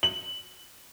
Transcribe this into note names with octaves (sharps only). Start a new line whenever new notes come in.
F#7